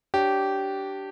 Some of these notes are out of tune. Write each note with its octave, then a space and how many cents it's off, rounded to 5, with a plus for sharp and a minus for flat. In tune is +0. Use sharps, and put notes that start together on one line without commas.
D4 +0 G4 -15 C#5 +0